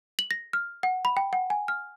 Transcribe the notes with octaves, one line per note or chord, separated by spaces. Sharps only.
F#7
A#6
F6
F#5
B5
G5
F#5
G#5
F6